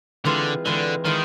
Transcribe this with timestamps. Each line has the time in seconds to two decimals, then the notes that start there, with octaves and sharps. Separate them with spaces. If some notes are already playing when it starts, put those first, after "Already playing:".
0.25 D3 E3 G#3 C4 F4
0.65 D3 E3 G#3 C4 F4
1.05 D#3 E3 G#3 C4 F4